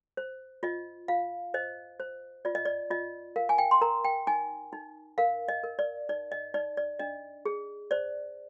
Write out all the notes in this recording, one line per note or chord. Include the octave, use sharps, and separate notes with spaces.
C5
F4 D#5
F4 F5
C5 D#5
C5
F4 D5
D#5
D5
F4 D#5
A#4 F5
G#5
G5
C6
A#4 A#5
G5
D#4 G#5
D#4
A#4 F5
D#5
A#4
D5
D#4 D5
D#5
D#4 D5
D5
D4 D#5
G#4
C5 D5